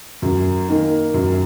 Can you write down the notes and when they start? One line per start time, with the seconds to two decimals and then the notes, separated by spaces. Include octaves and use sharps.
0.22 F#2
0.68 D#3 A#3
1.14 F#2